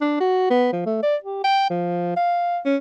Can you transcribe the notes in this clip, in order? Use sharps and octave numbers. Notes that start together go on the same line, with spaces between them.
D4
F#4
B3
F3
A3
D5
G4
G5
F3
F5
C#4